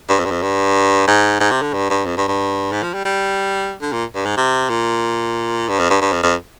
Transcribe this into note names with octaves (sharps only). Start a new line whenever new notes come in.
G2
F2
G2
F2
G2
G#2
G#2
C3
D3
G2
G2
F2
G2
G2
G#2
F3
G3
G3
D3
A#2
G2
G#2
C3
A#2
G2
F2
G2
G2
F2
F2